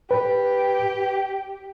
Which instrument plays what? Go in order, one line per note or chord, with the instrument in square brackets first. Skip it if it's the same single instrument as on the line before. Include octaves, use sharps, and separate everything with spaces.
[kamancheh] G4 [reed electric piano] B4